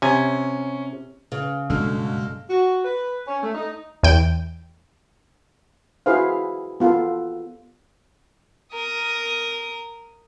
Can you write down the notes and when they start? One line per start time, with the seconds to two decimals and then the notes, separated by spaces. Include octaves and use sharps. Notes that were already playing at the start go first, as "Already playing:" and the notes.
0.02 C3 C#4 G#5
1.32 C#3
1.70 F#1 G2 B2 D3 G#3 A#3 E6 F6
2.49 F#4
2.84 B4
3.26 C#4
3.42 A3
3.55 D#4
4.03 E2 G5
6.06 E4 F#4 G#4 B4 C5 F5
6.80 B3 F4 G4 A4 A#4
8.73 A#4 D#6